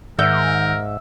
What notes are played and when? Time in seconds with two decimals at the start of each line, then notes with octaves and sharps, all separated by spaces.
0.19 G#2 D#3 A#4 E5 F#5 G6